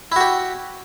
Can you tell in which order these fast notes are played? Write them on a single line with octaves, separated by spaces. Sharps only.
E4 F#4 G4